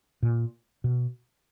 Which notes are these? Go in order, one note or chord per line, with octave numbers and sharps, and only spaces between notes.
A#2
B2